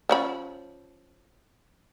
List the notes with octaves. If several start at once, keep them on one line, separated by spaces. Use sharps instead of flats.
F3 C#4 B5